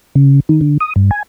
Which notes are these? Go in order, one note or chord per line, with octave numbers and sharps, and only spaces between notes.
C#3
D#3
D3
D#6
G2
G#5